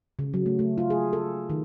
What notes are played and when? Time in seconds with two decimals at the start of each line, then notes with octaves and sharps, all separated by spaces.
0.19 C#3
0.34 F#3
0.46 A3
0.59 A3
0.78 F4
0.90 G#4
1.13 A4
1.50 D#3